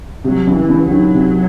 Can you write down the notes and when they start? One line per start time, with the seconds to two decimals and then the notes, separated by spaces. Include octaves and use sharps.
0.24 C3 F#3
0.47 C#2
0.54 E3
0.69 C#2
0.85 F#3
0.92 D#3
1.14 C3